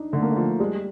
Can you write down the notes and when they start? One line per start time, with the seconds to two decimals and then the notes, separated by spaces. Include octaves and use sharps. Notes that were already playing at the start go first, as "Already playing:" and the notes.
Already playing: D4 D#4
0.13 D3 A3
0.22 A#3
0.31 F3 A3
0.60 G3 G#3